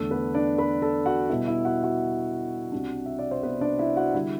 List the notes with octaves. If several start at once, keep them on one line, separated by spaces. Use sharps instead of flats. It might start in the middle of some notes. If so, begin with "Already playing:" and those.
Already playing: E2 D3 A3 A4
B3 B4
D4 D5
B4 B5
A4 A5
F#4 F#5
B2 G3 B3 E4 E5
E4 E5
F#4 F#5
F#4 F#5
C2 C3 G3 D4
E5
D5
C5
B3 B4
D4 D5
E4 E5
F#4 F#5
D3 G3 E4 E5